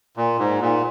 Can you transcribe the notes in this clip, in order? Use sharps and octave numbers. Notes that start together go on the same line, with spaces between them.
A#2
G#2
A#2